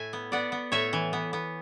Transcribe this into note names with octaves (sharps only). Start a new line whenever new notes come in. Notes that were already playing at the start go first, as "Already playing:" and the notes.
Already playing: A2 E5 G#5
B3
B3 D5 F#5
B3
A2 C#5 E5
E3
B3
B3